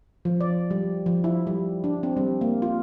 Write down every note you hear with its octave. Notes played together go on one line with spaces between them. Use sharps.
F3
D5
G3
F3
E4
G3
D4
C4
G3
A#3
F4